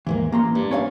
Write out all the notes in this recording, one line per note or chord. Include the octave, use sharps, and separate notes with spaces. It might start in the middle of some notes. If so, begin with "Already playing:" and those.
D#2 G#2 E3 A#3
A1 A#3 A#5 C6
G2
C#4 C#5 F5